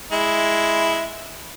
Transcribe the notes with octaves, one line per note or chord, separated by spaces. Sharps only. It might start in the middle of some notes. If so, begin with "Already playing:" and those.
G#3 E4